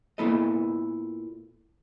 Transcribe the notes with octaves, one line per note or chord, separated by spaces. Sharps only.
A#2 A#3 B3 E4 A4 D#5